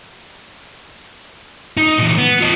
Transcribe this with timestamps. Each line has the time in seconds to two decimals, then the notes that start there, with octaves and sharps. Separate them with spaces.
1.77 D#4
1.98 A#2 E3
2.18 B3
2.40 F4 D#5